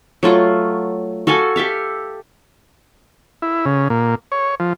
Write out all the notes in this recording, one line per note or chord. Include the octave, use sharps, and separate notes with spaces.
F#3 A3 F4
F#4 A4 F5 G#5
G4 A4 E5 F5
E4
C#3
A#2
C#5
F3